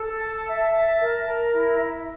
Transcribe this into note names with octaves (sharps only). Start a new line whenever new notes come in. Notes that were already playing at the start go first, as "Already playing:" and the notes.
Already playing: A4
A5
E5
A5
A#4
A#4
E4
E4